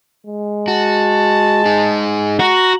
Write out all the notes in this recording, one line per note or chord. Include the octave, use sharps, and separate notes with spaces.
G#3
F#4 A5
D#4 G#4
F#4 A#5